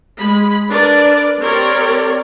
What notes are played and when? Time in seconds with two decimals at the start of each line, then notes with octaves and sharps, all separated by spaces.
0.19 G#3 B5
0.69 D4 A#4 B4 D5
1.39 C4 G4 A#4 C#5 D5